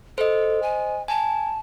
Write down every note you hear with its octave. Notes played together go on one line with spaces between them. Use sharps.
A4 C5 D#5
G#5
G#5 A5